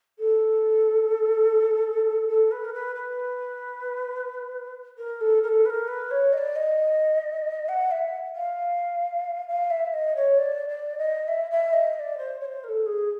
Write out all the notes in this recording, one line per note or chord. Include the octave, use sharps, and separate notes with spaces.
A4
A4
B4
A#4
B4
B4
A#4
A4
A#4
A4
B4
A#4
B4
C#5
D#5
D5
D#5
F#5
E5
F5
F5
E5
D#5
C#5
D5
D5
D#5
E5
E5
D#5
D#5
D5
C5
C#5
C5
A#4
A4
G#4